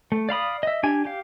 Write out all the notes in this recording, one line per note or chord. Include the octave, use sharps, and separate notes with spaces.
A3
D5 F5 B5 D#6
D#5 E5
D4 G4 G#5
G4 F5